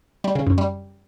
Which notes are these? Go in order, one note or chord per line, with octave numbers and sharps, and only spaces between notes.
G3
C#3
F#2
G3